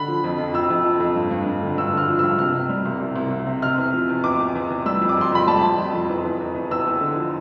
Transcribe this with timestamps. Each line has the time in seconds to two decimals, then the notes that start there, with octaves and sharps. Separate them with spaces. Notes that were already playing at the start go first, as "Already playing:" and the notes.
Already playing: D3 B5
0.08 F3
0.24 F2
0.39 F2
0.54 F2 E6
0.70 F2
0.85 F3
1.00 F2
1.16 G2
1.31 G2
1.46 G2
1.62 D3
1.77 G2 E6
1.93 D3 F6
2.09 F3
2.19 E6
2.23 G2
2.39 C3 F6
2.55 C3
2.69 G3
2.85 C2
3.00 C2
3.16 C2
3.31 C2
3.47 C3
3.62 C3 F6
3.78 E2
3.94 F3
4.09 E2
4.24 E2 D6
4.40 E2
4.55 E2
4.70 E2
4.86 G3 E6
5.01 F2
5.09 D6
5.17 F2 C6
5.31 F2 B5
5.47 G3 A5
5.63 F2
5.78 F2
5.94 F2
6.09 E2
6.25 E2
6.40 E2
6.55 E2
6.71 E2 E6
6.86 E2
7.01 D3
7.17 F3